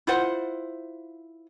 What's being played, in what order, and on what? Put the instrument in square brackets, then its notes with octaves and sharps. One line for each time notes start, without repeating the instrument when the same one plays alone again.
[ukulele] E4 F4 C5 F#5